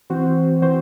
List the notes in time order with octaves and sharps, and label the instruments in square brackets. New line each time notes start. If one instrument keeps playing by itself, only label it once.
[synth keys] E3 C4 F#4 C5
E3 C4 F#4 C5